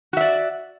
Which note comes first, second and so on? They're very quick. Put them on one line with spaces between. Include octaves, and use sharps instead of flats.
F#4 E5 D5